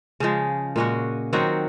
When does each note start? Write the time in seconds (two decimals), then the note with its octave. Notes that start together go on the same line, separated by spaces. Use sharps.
0.20 C#3 F3 G#3
0.76 A#2 G#3 C#4 F#4
1.33 D#3 F#3 C4 F#4